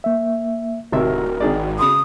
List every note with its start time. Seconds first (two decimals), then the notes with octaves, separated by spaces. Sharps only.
0.04 A#3 E5
0.92 D1 G#1 C3 F#4 A#4 E5
1.40 G#1 D#3 G#4 D5
1.79 C#3 B5 C6 D#6